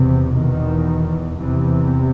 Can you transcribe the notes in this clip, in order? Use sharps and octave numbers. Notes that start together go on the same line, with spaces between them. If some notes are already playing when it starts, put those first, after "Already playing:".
Already playing: E2 C3
E2 B2 D#3
E2 C3 E3